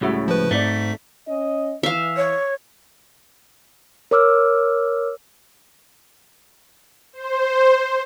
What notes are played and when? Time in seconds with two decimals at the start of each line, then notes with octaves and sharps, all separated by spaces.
0.01 C#2 A2 C#3 G3 F#4 E5
0.28 F3 B4
0.51 G#2 A3 C4 D#4 D5 B6
1.27 C#4 D#5
1.83 E3 E5 F5
2.16 C#5
4.11 A#4 C#5 D6 E6 F6
7.13 C5